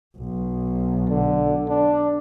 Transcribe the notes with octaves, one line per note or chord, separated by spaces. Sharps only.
B1
D3
D4